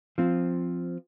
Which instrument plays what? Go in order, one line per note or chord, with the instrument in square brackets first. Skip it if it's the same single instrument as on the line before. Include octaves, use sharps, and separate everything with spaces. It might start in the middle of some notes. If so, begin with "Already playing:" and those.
[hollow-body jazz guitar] F3 C4 F4